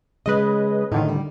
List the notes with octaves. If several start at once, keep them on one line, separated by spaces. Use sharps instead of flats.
C#3 G#3 B4 D#5
A2 D3 D#3 D#4
G3